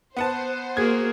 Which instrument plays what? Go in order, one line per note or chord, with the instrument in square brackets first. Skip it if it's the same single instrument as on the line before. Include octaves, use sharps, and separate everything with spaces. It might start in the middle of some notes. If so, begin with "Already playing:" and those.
[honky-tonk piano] B3 F#5 A5 [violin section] C5
[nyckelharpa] A#3 [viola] F#4 G#4 [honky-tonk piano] G#6